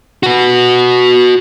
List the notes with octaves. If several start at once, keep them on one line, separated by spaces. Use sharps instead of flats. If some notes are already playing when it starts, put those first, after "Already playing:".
F#4 B4